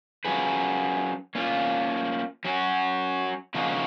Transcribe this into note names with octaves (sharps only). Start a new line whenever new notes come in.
F#3 C#4 F4 G#4 B4
A#3 C#4 F4
F#3 C#4 F#4
C#3 F3 A#3 D#4 F#4